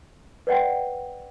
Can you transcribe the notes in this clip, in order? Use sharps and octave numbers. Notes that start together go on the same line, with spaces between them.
B4 C#5 D5 F#5 G5